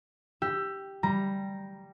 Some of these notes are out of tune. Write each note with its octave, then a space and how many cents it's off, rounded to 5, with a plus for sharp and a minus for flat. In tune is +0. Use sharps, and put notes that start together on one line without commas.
G4 +0 E6 +20
G3 +0 A#5 +5